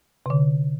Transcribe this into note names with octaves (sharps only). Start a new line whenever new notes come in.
C3
D3